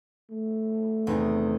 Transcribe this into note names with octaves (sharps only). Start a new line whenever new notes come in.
A3
E2 C3 D#3